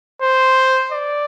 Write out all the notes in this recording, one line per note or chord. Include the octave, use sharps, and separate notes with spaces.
C5
D5